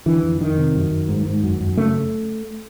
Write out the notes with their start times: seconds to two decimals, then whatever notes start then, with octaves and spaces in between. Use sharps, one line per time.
0.06 D3 E3
0.23 F2
0.40 F2 D#3
0.57 C3
0.75 F#2
0.91 F#2
1.09 G#2
1.26 G#2
1.44 F#2
1.61 F#2
1.77 C#3 A3